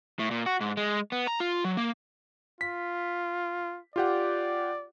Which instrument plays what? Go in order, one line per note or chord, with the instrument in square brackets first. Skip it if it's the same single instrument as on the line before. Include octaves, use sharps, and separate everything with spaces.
[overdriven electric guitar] A2
A#2
F#4
G#2
G#3
B3
A#5
F4
F#3
A#3
[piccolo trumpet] F4 [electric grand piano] B6
[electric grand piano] F4 G4 F#5 [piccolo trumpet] D5